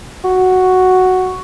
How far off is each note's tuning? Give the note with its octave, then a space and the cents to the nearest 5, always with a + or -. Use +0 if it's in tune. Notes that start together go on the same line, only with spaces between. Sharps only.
F#4 +0